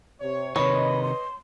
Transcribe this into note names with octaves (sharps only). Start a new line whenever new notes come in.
C3 C#5
C3 D#3 B4 C#5 D#5 B5
C6